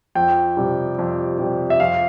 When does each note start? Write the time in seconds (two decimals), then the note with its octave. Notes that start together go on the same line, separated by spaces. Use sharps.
0.15 F2 G5
0.57 C3 G3
0.99 F2
1.39 C3 G3
1.70 E5
1.80 F2 F5